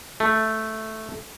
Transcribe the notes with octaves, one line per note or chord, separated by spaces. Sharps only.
A3